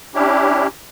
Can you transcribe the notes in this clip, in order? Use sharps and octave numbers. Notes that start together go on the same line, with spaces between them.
C#4 D4 E4 G4